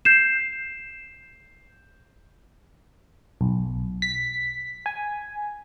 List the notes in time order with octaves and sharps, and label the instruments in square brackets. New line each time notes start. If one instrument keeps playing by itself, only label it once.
[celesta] G6 C7 E7
[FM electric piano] B1
B6
G#5